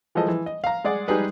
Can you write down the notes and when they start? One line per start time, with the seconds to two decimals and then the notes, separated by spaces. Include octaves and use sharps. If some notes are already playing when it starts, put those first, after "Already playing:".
0.15 E3 F3 G#3 A4 D#5
0.28 E3
0.46 D#5
0.64 F5 A#5
0.84 G#3 G#4 D5 F#5
1.08 G3 G#3 D#4 G4 G#4 B4